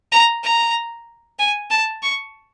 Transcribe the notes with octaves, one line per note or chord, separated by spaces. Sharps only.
A#5
A#5
G#5
A5
C#6